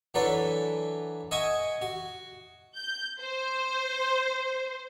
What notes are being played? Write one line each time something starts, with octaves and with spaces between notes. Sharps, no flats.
E3 F#3 D4 A4 B4
D#5 E5 F#5 G#5 C#6 D#6
F#4
G6
C5